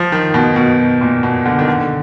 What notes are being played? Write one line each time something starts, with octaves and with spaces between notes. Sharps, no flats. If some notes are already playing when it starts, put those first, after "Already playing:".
Already playing: F3
D#3
B2
B2
A#2
B2
D3
D#3
D3